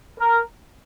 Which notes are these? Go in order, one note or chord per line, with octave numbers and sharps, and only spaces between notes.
A#4